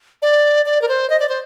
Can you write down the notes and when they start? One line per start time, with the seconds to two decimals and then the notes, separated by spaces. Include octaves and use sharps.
0.22 D5
0.66 D5
0.82 A#4
0.89 C5
1.10 D#5
1.20 D5
1.29 C5